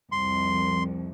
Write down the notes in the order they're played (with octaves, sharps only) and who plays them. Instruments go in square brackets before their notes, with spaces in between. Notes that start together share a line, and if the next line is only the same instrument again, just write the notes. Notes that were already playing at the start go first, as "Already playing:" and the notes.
[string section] C2 F2 [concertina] C6